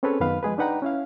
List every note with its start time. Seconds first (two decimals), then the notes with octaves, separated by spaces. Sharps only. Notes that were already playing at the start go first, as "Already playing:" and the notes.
0.03 C4 C#4 G#4 A4 B4 C#5
0.20 F#2 D#3 B3 B4 F5 B5
0.43 F3 G#3 G#4 B4
0.58 D4 D#4 B4 F#5 G5 A#5
0.82 C#4 E4 F5